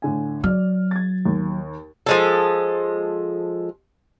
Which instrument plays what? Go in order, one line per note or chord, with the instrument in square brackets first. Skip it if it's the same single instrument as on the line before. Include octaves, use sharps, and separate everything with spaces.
[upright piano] A2 D3 G#5
[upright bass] F#3 [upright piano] D5 F6
[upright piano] G#6 A6
D#2
[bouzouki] F3 G#3 A4